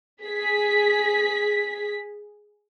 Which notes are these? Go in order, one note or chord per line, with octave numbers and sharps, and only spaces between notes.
G#4 B6